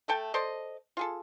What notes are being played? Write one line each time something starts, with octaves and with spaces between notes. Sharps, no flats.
A3 A4 G5 A5
A4 C5 D5 D#5
F4 G#4 A4